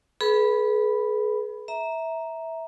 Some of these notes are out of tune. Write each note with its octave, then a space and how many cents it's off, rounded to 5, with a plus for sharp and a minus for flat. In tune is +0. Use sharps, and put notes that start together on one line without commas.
G#4 +35 B4 -20 B5 +0
E5 -15 A#5 +0